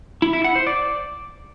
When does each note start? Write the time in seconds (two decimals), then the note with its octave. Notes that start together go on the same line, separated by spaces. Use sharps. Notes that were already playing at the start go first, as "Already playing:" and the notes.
0.22 E4
0.33 E4
0.44 F#5
0.56 C5
0.67 D5